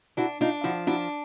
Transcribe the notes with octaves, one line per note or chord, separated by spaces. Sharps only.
D4 E4 F#4
D4 D#4 F4
F3 E4 F#4
D4 E4 F#4